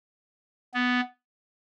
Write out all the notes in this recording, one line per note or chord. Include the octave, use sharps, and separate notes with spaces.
B3